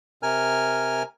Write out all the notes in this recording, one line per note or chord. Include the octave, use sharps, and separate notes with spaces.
C3 A#4 G#5 F6